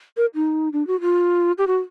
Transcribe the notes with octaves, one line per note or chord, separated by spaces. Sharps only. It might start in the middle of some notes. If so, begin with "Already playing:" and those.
A#4
D#4
D4
F#4
F4
G4
F#4